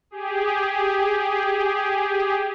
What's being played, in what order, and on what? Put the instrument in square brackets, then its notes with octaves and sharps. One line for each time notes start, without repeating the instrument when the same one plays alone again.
[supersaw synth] G4 G#4